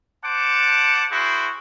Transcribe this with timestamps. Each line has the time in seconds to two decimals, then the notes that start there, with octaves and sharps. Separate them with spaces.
0.24 C5 F#5 A5 D6
1.11 E4 F#4 G#4 C5